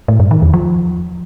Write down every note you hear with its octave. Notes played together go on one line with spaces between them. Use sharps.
A2
G2
D#3
E2
F3